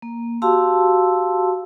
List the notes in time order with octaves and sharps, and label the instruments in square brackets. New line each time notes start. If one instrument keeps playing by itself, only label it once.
[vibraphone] A#3
F#4 G4 F5 A5 C6 E6